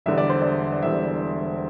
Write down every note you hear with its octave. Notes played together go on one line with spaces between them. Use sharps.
E1 E2 D3 G3 E5
D5
C5
D5
D5
E1 E2 D3 G3 E5